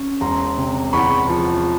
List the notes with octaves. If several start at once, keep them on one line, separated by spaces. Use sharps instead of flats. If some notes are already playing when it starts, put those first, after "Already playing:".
Already playing: C#4
E1 A#5 C6
C3
E2 B5 C#6
F3